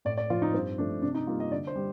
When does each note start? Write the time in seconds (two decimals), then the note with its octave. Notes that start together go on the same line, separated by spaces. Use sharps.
0.05 A2 D5
0.17 D5
0.30 F3 C4 F4
0.42 D#4
0.54 G2 C4
0.78 F3 A3 C4 D4
1.02 C3 D4
1.14 D#4
1.27 G3 A#3 F4
1.40 D#5
1.51 D3 D5
1.67 C5
1.75 G3